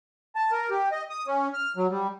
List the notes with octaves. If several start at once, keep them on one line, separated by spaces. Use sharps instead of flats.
A5
A#4
G4
D#5
D#6
C#4
F6
F#3
G3